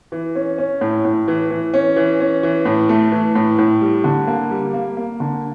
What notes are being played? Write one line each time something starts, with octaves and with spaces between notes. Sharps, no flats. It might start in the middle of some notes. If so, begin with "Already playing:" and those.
E3
C#4
C#4
A2
A2
E3
E3
C#4
E3
C#4
E3
A2
A3
E3
A2
A2
G3
D3
A#3
G3
A#3
A#3
D3